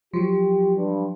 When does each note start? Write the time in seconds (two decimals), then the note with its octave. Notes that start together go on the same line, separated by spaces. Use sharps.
0.13 F3 F#3 G4
0.76 G2